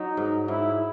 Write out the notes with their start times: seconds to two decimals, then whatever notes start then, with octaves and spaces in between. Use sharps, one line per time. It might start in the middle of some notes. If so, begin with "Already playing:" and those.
Already playing: F#3 D#4
0.17 G#2
0.48 G#2 E4